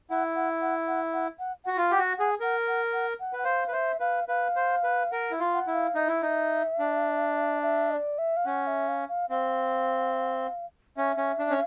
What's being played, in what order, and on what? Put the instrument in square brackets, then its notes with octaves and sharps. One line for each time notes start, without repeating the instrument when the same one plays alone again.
[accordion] E4 [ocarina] F#5
[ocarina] F#5
F#5
F#5
F#5
F#5
[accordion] F#4 [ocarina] F#5
[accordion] F4
[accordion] G4 [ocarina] F#5
[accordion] F#4
[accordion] G#4 [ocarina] F#5
[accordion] A#4 [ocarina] F#5
[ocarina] F#5
F#5
F#5
[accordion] B4
[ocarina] F#5
[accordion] C5 [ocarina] F5
[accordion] B4
[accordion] C5 [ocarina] E5
[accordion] B4 [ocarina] F5
[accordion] B4 [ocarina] F5
[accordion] C5
B4
[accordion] A#4 [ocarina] F#5
[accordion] E4
F4
[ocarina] F#5
[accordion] E4
[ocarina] F5
[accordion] D#4 [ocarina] E5
[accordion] E4
D#4
D4
[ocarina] E5
D#5
D5
E5
F5
[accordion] C#4 [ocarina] F#5
[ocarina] E5
F5
F5
[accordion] C4 [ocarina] F5
[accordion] C#4 [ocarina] E5
[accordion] C#4
D4
C#4